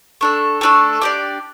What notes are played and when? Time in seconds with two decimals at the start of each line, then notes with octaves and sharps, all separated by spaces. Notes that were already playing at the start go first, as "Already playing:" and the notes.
0.21 A3 D4 A4
0.61 A3 D4 A4
1.01 D4 G4 D5